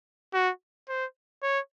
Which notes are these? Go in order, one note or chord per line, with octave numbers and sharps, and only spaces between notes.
F#4
C5
C#5